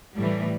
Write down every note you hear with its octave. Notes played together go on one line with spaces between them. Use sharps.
A2 E3 G3